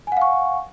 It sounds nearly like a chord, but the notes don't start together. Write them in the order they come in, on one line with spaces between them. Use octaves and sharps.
G#5 F#5 F5 C#6